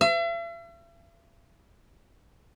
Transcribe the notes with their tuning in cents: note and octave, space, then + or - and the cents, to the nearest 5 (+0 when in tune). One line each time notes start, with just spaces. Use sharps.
E5 +45